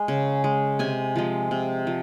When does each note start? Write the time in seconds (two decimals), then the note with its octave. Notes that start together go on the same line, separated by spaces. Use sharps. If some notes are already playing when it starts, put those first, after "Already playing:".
Already playing: G#3
0.08 C#3
0.44 G#3
0.79 C3 G#5
1.16 F3 G#3
1.51 C3
1.87 F3